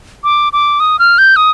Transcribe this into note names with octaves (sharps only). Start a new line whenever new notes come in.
D6
D6
D#6
F6
G6
D#6